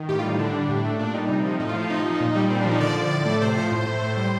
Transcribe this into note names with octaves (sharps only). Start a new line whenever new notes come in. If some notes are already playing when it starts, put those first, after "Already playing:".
Already playing: D#3
A2 G4
F4
G3 D#4
D3 D4
G3
A2
A3
A#2 D4
G3 D#4
C3
F3
A2 D#4
F4
F3
F4
C3 D#4
F3
A#2
G3
A#2 C4
D4
F3
D#4
D3 D5
F3
A2
A3
C3 C5
F3
A2
A3
A2
G3